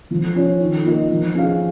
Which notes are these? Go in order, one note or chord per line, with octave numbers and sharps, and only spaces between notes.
F3
C#4 F4 C#5
D#3
A#3 F4 A#4 D#5
F3
C#4 F4 G#4 F5